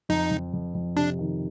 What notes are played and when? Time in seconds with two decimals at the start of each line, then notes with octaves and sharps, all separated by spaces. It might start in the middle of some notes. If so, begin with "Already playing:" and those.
0.09 F2 D#4
0.31 F2
0.53 F2
0.75 F2
0.97 C3 D4
1.19 D#3